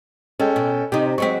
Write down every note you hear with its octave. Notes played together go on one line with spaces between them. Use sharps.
G#3 C#4 A4 G5
B2
C3 D#4 G4
F#3 G#3 C4 C#6 B6